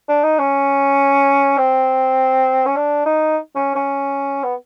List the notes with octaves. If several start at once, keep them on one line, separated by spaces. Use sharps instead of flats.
D4
D#4
C#4
C4
C#4
D4
D#4
C#4
C#4
B3